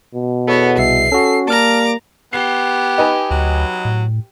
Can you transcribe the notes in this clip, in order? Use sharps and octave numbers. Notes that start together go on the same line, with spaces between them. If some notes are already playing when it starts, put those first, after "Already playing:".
B2
E2 B3 F#4 A4 C#5
C2 E5 C7
C#4 F#4 A4
G3 A#3 A5 A#5 D6 F6
B3 G4 C7
D#4 B4 G#5
D2 F#3
A2